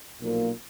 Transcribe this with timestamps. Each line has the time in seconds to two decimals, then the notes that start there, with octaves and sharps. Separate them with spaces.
0.20 B1 A#2 F3 A#3